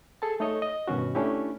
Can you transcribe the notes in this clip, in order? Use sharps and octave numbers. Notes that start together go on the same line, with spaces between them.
G#4 A4 G#5 A5
A3 D#4 A4 C#5 D#5
D#5
G2 B2 D#3 C#4 F#4
A3 C#4 D4 E4 G4